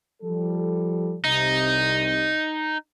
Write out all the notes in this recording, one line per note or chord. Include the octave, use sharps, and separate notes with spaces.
F3 G3 A4
C2 C3 D#4